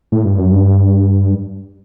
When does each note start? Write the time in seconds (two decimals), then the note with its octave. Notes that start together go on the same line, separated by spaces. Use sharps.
0.12 A2
0.25 G2
0.38 F#2
0.52 G2